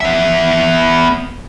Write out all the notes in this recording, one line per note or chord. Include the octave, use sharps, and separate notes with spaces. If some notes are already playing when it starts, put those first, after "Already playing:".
B3 E5